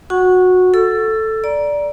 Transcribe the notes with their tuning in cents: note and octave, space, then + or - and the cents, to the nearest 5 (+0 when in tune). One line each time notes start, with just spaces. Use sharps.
F#4 -20 F#5 +5 C#6 -5
A4 +0 E6 +25
D5 -5 A#5 +25